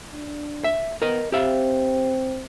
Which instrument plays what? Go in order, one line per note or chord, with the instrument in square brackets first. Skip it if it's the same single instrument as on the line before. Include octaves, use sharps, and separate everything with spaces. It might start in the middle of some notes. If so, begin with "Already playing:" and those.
[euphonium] D4
[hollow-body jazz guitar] E5
[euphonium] B3 [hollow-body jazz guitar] A#4 D#5
[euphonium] C4 [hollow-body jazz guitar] G4 E5 F5